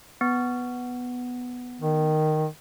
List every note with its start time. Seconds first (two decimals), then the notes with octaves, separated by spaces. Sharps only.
0.21 B3
1.81 D#3